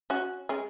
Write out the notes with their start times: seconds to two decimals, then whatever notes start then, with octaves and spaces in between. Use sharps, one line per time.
0.10 C#4 F#4
0.49 G#3 C#4